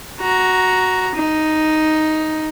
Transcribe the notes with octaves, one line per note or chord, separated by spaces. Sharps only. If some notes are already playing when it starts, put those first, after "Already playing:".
F#4 A#5
D#4